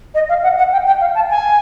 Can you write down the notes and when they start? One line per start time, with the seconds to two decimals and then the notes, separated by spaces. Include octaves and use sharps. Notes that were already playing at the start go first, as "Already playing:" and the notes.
0.14 D#5
0.29 F5
0.43 F#5
0.58 F#5
0.72 G5
0.86 G5
1.01 F5
1.15 A5
1.30 G#5